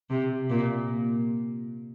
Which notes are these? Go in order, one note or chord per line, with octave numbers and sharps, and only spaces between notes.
C3
A#2